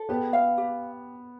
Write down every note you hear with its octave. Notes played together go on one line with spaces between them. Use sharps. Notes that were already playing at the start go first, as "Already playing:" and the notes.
Already playing: A4
B3 G4
F5
G4